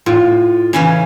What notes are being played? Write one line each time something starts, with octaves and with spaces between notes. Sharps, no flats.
A2 F4
C#3 E3 C#4